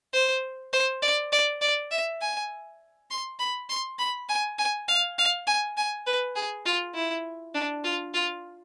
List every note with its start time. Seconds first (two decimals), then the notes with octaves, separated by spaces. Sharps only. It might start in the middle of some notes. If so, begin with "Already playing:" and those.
0.13 C5
0.73 C5
1.02 D5
1.32 D5
1.61 D5
1.92 E5
2.21 G#5
3.11 C6
3.39 B5
3.69 C6
3.99 B5
4.29 G#5
4.58 G#5
4.88 F5
5.18 F5
5.47 G#5
5.77 G#5
6.06 B4
6.36 G#4
6.66 F4
6.95 E4
7.55 D4
7.84 F4
8.14 F4